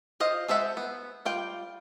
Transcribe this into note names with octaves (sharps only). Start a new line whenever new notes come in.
F4 C5 D#5 F5
G#3 A4 C5 E5 F#5
B3
G3 F4 G5